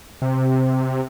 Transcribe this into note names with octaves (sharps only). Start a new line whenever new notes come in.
C3